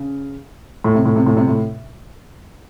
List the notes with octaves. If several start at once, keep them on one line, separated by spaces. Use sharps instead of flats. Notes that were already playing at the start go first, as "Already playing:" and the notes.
Already playing: C#3
A2
C3
A2
C3
A2
C3
A2